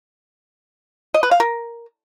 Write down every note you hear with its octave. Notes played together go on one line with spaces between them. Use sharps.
D#5
B4
F5
A#4